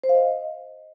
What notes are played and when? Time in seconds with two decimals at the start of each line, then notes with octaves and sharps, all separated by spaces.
0.04 C5
0.09 F5
0.15 D#5